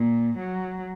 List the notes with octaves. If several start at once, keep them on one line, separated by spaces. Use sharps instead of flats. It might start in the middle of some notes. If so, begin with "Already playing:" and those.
Already playing: A#2
F#3